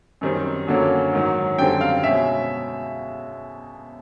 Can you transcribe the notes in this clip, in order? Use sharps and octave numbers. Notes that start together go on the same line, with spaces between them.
F#2 D#3 G3 C4
F#2 D3 F#3 A#3 C#4
G#2 D#3 F#3
F#2 D3 G3 C4 G5
F5
B2 G#3 C#4 E5